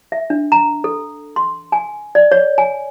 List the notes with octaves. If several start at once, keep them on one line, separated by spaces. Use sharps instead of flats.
E5
D4
A#5
A4
C6
G#5
D5
C#5
G#5